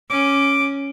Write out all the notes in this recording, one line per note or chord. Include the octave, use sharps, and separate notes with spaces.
C#4 D6